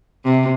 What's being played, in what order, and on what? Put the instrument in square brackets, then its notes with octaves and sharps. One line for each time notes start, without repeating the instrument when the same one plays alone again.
[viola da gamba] C3